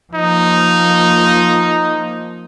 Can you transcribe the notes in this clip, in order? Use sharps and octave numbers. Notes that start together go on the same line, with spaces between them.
F3 A#3 D#4